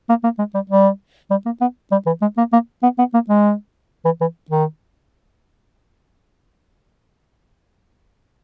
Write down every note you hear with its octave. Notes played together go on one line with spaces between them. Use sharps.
A#3
A#3
G#3
G3
G3
G3
A#3
B3
G3
E3
G#3
A#3
A#3
B3
B3
A#3
G#3
E3
E3
D#3